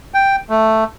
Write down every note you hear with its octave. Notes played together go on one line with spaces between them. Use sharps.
G5
A3